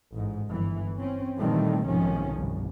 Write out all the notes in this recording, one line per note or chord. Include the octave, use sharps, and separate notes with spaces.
A1 G#2
G1 E3
C4 C#4
A#2 D#3 E3 G3 A3 C4
B1 G#2 C3 D#3 F3 C#4
G1 C2 B2